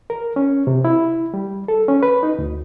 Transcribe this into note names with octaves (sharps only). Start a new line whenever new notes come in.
A#4
C#4
C3
E4
G3
A4
C#4
B4
D#4
D2